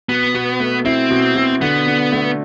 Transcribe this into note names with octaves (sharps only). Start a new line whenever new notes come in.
B2 B3
B2
A3
C4 E4
B2
B2
D3 B3
D3
A3